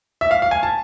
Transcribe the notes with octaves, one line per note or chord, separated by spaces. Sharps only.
E5
F5
F5
G#5
A5